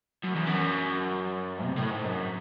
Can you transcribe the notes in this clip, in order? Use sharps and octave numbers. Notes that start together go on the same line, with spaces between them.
F#2
E2
F#2
C3
A2
G#2
F#2